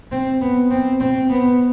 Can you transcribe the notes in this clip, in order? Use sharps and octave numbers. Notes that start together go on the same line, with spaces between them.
C4
B3
C4
C4
B3